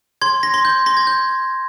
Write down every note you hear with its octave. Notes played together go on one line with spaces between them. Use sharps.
C6 G#6
A#6
C6
G6
C6 A#6
G#6
G6